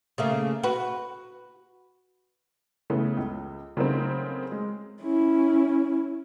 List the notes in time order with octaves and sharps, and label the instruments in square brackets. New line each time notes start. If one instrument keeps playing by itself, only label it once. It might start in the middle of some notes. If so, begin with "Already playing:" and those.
[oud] C#3 A3 A#3
F#4 B4
[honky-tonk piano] C#3 E3 A3 B3
C#2
C#3 F#3 A3 A#3 C4 D#4
G#3
[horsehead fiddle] C#4 E4